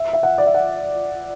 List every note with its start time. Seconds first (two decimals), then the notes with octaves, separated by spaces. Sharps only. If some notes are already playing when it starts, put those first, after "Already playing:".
Already playing: E5
0.13 E5
0.23 F#5
0.38 D5
0.46 E5
0.54 F#5